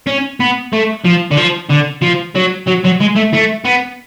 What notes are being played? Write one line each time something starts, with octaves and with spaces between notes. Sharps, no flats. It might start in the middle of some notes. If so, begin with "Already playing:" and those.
C#4
B3
A3
F3
D3
F3
D3
F3
F#3
F#3
F#3
G#3
A3
A3
B3